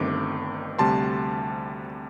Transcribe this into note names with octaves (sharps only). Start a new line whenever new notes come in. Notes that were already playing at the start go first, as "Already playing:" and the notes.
Already playing: G1 G2 D#3 A3 C4 D6
D2 C3 G3 A5 C6